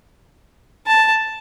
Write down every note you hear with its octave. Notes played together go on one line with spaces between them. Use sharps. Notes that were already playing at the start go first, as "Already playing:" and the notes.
A5